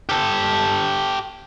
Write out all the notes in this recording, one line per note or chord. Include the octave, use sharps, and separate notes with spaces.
G4 A4